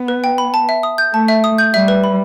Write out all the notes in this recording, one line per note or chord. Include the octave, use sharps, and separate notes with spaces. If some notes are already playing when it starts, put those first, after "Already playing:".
Already playing: B3
B4
G5
B5
A5
E5
D#6
G6
A3 A5
E5
D#6
G6
G3 E5
B4
B5